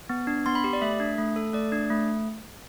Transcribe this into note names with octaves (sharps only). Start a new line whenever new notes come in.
B3
D4
B3 C6
B5
G4
D5
A3 E5
D4
A3
A4
A3 D5
D4
A3